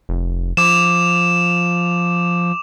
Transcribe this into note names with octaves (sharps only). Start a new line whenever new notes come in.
F1
F3 D6 E7